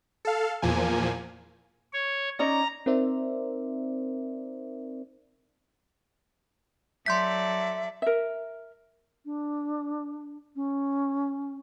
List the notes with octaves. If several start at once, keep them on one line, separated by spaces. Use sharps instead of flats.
A4 F5
E2 A#2 F3 A#3 G#5
C#5
C#4 D#4 D5 A#5
C4 D#4 A#4 C5 D5 E5
F#3 A4 D5 E5 C6 G6 B6
A#4 E5
D4
C#4